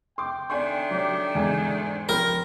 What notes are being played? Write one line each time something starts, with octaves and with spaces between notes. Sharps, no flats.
G5 C6 D6
D#3 A3 D4 D5 G#5 C6
F#3 G4
E2 G#2 G#5
C5
F3 A#4 G5 B5